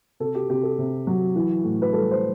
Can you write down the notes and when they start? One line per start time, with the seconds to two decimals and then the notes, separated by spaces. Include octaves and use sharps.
0.20 C3 A4
0.35 G4
0.49 C3 G4
0.63 A4
0.78 C3
1.07 F#3
1.36 E3
1.63 A2
1.82 B4
1.92 G3 A4
2.11 C5